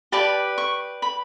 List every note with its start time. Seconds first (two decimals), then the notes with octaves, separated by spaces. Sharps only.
0.12 G4 B4 D5 A5
0.58 C#6
1.02 B5